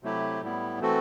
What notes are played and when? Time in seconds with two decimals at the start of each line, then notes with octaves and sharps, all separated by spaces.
0.03 C3 F#3 A3 E4 G4
0.41 A2 G3 B3 E4
0.80 E3 A3 C4 F#4 A4